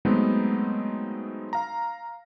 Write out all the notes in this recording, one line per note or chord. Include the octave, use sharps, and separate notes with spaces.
F#3 G#3 A3 B3 C4 D#4
F5 A#5